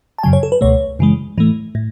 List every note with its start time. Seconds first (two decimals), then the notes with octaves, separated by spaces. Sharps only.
0.18 A5
0.23 F#2 C#3 F#3 G#5
0.33 C#5
0.43 A4
0.52 B4
0.61 C#2 B2 A3 C#5
0.99 F#2 C#3 E3 G#3
1.38 A2 E3 A3
1.75 A2